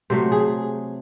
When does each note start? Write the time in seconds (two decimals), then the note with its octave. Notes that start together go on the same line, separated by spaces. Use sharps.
0.10 C3 F#3 A3 C5
0.32 G#4